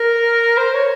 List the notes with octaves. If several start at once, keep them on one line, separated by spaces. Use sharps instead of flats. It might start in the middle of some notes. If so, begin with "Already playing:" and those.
Already playing: A#4
C5
C#5